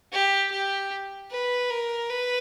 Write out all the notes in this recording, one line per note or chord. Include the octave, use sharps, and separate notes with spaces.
G4
G4
B4
A#4
B4